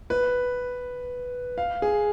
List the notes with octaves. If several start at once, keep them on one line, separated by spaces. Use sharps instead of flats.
B4
F5
G#4